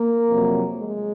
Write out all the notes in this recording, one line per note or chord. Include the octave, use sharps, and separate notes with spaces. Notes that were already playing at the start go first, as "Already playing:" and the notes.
Already playing: A#3
F2 C3 F#3
G#3